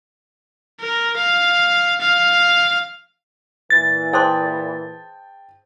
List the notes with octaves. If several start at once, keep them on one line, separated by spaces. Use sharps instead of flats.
A#4
F5
F5
A#2 E3 A6
G#4 C5 G5 A5 C6 D#6